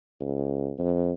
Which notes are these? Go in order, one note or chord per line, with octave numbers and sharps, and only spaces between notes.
C#2
F2